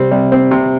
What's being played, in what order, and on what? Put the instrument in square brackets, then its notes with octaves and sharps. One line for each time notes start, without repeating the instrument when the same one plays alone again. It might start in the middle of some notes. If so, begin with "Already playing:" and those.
Already playing: [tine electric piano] C3 [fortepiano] G3 C4
[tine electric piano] C3 [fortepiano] G3
[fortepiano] C4
C3